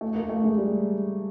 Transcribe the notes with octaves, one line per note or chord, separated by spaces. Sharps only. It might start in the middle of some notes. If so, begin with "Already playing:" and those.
A3
A#3
A3
G#3
G3